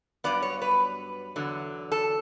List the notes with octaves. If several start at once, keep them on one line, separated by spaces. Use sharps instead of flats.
G2 F#3 B3 D5
C#5
B4
E2 D3 F#3
A4